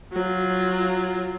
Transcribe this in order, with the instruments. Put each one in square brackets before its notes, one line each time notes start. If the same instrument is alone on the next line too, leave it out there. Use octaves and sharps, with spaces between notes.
[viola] F#3 F4